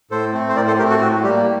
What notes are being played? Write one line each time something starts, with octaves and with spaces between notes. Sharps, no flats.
A2 A4 C5
A3 C4
C5
A2 A#4 D5
A4 C5
A3 C4 G4 A#4
F#4 A4
A2 F#4
G3 A#3 G4